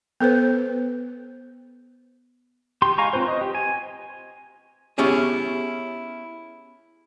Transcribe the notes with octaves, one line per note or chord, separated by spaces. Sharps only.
B3 A4 B4 C5
G4 C6
G#3 F5 G#5 A#5 C#6
C4 F4 B4 C5
D#5
G4
G#5
B3 C#4 E4 G4 G#4